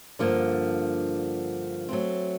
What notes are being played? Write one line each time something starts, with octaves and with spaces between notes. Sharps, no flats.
G2 D3 F3 A#3 D4
F#3 A3 C4